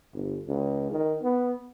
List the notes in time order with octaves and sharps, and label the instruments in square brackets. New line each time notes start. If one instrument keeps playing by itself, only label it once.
[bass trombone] G1
C#2
D#3
B3